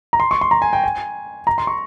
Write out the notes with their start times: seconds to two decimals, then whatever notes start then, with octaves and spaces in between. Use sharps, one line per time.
0.13 A#5
0.20 C6
0.31 C#6
0.41 C6
0.51 A#5
0.62 G#5
0.73 G5
0.84 G#5
1.47 A#5
1.58 C6
1.67 C#6